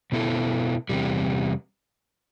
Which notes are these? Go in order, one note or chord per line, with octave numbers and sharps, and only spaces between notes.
B2 B3 E4 A4
E2 C3 G3